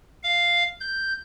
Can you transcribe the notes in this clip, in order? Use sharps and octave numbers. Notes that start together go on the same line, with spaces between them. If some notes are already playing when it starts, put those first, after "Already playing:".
F5
G6